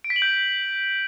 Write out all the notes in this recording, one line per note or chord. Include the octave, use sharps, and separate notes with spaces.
D7
B6
F#7
G6